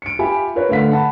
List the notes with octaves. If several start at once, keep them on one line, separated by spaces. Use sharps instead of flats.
C#7 D7
F4 G4 E5 G#5 B5
F4 A#4 B4 C#5
A2 D3 F5 B6
F#5 A5 B5